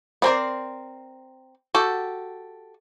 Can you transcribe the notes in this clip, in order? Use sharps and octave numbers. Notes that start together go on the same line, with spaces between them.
B3 C4 A#4 C5 D5
F#4 G4 A4